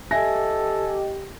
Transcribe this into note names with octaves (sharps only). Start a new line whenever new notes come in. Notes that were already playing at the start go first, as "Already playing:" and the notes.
G4 A4 D#5 E5 G#5 A#6